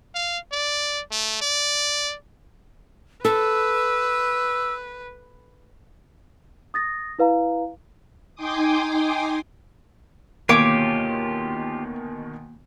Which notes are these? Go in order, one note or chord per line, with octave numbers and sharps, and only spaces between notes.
F5
D5
A3
D5
A4 B4 E6
D#6 A6 A#6
E4 B4 F5 A#5
D#4 G5 G#5 C6 D6 D#6
D2 B2 D#3 A#3 F4 G4 C#5 D6